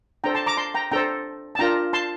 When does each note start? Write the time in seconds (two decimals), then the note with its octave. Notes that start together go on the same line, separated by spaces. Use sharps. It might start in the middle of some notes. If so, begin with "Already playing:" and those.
0.24 D4 A4 C5 G5 A#5
0.35 A5 C6
0.46 A#5 D6
0.57 A5 C6
0.74 G5 A#5
0.91 D4 A4 C5 G5 A#5
1.55 A5
1.59 D4 F4 A#4 G5 A#5
1.93 A5 C6